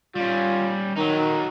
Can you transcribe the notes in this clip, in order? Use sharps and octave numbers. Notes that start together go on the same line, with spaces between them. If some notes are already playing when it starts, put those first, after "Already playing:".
G3 C#4 F4
D#3 F#3 D#4